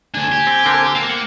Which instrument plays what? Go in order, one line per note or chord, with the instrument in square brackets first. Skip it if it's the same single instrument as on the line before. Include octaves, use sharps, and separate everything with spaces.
[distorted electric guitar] D2 D4 [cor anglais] G#5
[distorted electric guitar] G4
[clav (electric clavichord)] C4
D3 A#3 C4
[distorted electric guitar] A#3 [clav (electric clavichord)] F5 A5
[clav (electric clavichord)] F#5